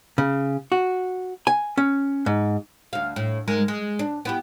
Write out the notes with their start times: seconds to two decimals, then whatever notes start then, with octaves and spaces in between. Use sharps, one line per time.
0.18 C#3
0.72 F#4
1.47 G#5
1.77 C#4
2.26 G#2
2.93 D2 F5
3.16 A2
3.48 G#2 G#3 A#4
3.68 G#3
3.99 D4
4.25 B3 E4 G4